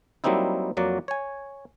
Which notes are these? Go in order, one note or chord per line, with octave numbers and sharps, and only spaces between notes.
F#3 G3 A#3 C4 D#4 E4
F2 F#3 A#3 F#4 D5
C#5 G#5